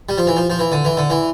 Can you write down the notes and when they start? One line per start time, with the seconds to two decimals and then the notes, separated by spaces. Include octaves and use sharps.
0.09 G3
0.18 F3
0.27 E3
0.36 F3
0.50 F3
0.59 E3
0.72 D3
0.85 E3
0.97 D3
1.10 E3